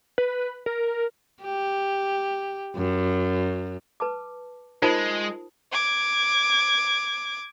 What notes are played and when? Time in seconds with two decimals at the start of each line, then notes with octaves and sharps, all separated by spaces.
0.18 B4
0.66 A#4
1.43 G4
2.75 F#2
4.00 B4 A5 D6
4.82 G#3 D#4 F4 A#4 C5 A5 D#6
5.72 D6 G#6